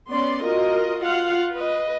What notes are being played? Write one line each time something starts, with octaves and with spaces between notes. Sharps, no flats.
B3 C#4 D5 C6
F4 F#4 A#4 D#5
F4 F5 F#5
B4 D#5